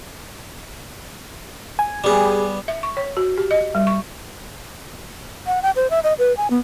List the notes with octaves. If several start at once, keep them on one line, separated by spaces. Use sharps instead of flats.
G#5
G3 B3 G4 G#4
E5
C#6
C#5
F#4
G4
D#5
G3
C#6
F#5
G5
C5
E5
D#5
B4
G#5
B3